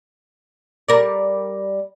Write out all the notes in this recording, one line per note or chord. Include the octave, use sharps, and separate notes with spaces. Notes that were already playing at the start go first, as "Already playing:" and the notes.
G3 A#4 D5